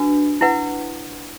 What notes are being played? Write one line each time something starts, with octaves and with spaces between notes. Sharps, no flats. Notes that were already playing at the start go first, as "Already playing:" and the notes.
Already playing: D4 F#4 B4
E4 B4 F#5